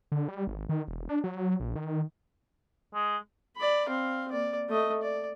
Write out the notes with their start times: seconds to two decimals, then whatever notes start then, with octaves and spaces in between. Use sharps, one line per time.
0.12 D3
0.28 G3
0.47 G#1
0.69 D#3
0.88 E1
1.09 D4
1.24 F#3
1.60 A#1
1.76 D#3
2.94 G#3
3.57 D5 B5
3.89 C4 F5
4.31 A#3 D5
4.69 A3 D#5
5.03 D5